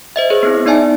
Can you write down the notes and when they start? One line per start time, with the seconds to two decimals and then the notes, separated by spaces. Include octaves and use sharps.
0.16 C5 D#5 E5
0.30 G#4 B4 C#5
0.43 B3 C4 E4
0.65 B3 D#4 D5 E5 G#5 A5